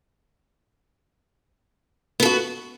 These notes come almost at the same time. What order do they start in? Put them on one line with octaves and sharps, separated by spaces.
B3 A4 F#4